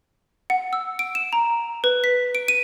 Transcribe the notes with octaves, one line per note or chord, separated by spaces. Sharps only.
F#5
E6
D7
E7
A#5
B4
B6
D7
D#7